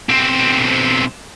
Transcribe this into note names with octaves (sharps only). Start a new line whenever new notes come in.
B1 C4